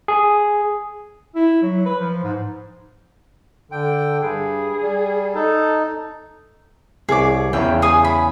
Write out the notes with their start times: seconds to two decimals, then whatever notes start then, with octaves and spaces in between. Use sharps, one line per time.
0.08 G#4
1.35 E4
1.62 F#3
1.85 B4
1.99 F3
2.23 G#2
3.72 D3 G5
4.23 G2 G#4
4.82 G3
5.35 D#4 A4
7.09 C2 G#4 C#5 D6
7.53 E2 C#3 E3 G5
7.82 G#4 G#5 D#6
8.05 B5